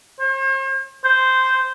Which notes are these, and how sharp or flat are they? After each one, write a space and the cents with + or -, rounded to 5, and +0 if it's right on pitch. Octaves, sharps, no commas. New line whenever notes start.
C5 +45
C5 -5